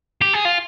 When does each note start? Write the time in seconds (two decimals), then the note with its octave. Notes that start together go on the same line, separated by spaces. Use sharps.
0.22 G4
0.34 G#4
0.45 F4